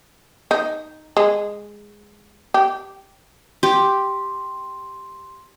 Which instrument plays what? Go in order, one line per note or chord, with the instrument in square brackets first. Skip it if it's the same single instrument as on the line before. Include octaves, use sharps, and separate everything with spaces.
[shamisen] D#4
G#3
G4
[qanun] G4 [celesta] C6